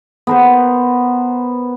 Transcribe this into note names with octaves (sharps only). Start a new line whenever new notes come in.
B3 A#4 C5